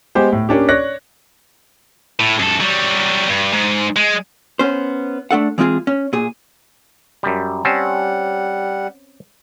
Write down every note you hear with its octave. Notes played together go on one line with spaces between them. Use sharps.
G#3 B3 G4 C5
A2
A#3 C#4 D4 G4
C#5 D5 F#6 A#6
A2
F#2 A4
F#3 G3
G2
G#2
G#3
B3 C#4 C5
A3 D4 A4 F#5
E3 G#3 C4 F4 G#4
C#4
A#2 G#4
F#2 G3
G3 C4 C#4 F#5 A5